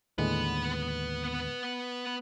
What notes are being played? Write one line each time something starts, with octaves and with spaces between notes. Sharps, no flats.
D#2 A2 D3 G#3 B3 B4